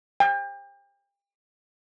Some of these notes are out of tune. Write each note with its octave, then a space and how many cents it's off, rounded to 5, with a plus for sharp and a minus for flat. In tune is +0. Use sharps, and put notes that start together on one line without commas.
G5 +35